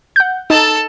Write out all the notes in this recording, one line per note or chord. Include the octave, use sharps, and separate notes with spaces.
F#5 G6
D#4 A4 A5